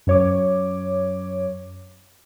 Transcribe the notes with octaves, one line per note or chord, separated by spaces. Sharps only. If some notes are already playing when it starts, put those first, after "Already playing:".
F#2 C#5 D6